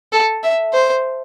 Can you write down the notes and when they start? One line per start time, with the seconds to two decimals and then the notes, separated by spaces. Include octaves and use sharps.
0.13 A4
0.43 E5
0.73 C5